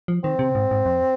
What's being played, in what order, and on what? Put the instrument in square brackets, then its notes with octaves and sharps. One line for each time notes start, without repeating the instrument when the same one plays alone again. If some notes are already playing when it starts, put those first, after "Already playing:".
[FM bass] F3
[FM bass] D#3 [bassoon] C4
[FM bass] C3
G#2
G#2
F2